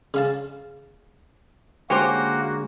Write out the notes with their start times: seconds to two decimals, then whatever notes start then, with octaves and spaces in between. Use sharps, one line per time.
0.14 C#3 F5 A5
1.90 D3 G#3 A#3 C#4 F#4 G4 C5